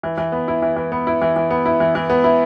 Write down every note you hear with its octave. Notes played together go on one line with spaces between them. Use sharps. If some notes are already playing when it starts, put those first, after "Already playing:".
E3
E3
B3
E4
E3
E3
B3
E4
E3
E3
B3
E4
E3
E3
B3
E4